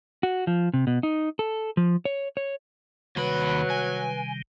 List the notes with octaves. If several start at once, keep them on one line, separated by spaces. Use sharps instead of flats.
F#4
F3
C3
B2
D#4
A4
F3
C#5
C#5
D#2 C3 D#3 F#3 G3 B4 B5
G#5